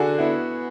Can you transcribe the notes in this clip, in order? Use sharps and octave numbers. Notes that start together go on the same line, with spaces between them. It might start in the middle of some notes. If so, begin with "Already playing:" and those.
Already playing: D3 F#4 G#4
B3 E4